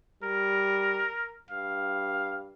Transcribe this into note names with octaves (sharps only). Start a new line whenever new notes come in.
G3 A#4
G2 F5